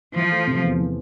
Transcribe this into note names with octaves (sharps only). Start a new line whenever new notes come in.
E3 F3
A3
C3
E2
E3